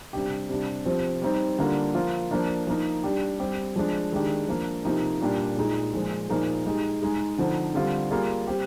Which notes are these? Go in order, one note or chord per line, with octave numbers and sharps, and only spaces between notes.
C3 G3 D4 G4
C3 G3 D4
C3 F3 C4
G3 C4 D#4 G4
D3 G3 A#3 D4 F4
F3 A#3 F4
F3 A#3 D4
F3 A#3 D#4
G3 D4 G4
G3 C4 G4
F3 G#3 D4
D#3 G#3 D4 G4
F3 A#3 D4
C3 F3 A#3 D#4 G4
A#2 G3 A#3 D4 G4
A#2 G#3 D#4 G#4
A#2 F3 G#3
A#2 F3 A#3 D#4 G#4
G#3 D#4 G4
G#3 D#4 G#4
D3 F3 C4 D#4
D3 G3 C4 F4
G3 A#3 F4 G#4
G3 C4 G4